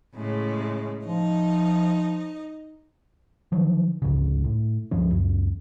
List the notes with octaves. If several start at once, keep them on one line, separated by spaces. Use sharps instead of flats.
A2 C#3 G#3
F3 D#4 D#5
D3 D#3 F3 F#3
G1 C#2 G#2 C#3
A2
C#2 G2 F3 C#4
C#2 F#2